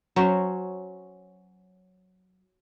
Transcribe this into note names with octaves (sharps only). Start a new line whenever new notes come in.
F#3 C#4 C5